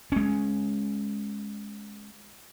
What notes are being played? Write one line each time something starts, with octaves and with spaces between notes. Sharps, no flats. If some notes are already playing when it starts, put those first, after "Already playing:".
G#3 C#4